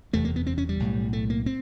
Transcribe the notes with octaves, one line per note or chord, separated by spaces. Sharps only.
F#1 E2 C3 A3
A#3
B3
C4
C#4
G3
B1 A2
A3
A#3
C4